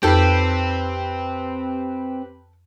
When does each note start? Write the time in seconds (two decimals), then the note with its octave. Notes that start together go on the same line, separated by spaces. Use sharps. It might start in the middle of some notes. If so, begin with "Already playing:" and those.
0.03 F2 C4 D#4 G4 A4 B4 G5